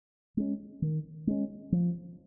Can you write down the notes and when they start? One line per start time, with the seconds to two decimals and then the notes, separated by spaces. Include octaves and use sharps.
0.37 G#3 C#4
0.82 D#3
1.27 G#3 C#4
1.72 F3